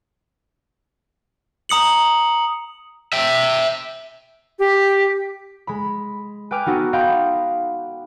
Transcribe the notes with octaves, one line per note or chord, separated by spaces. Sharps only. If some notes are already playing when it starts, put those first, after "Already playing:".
A#5 D#6 C#7 F#7
E5 G5
G4
G#3 B5
B4 G5 G#5 D6 F6 G6
B3 D#4 F#4 A4
D#5 F5 G5 B5 C6 G6